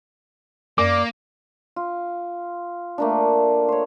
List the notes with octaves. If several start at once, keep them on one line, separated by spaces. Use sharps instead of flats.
F#2 A#3 D5 D6
F4
A3 A#3 D4
C5 C#5